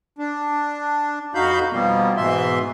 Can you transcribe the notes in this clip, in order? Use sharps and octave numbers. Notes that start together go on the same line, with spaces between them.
D4
F2 D#4 F#4 F5 B5 G6
B2 F3 G3 A#3 B3
G#2 B2 E3 E5 C6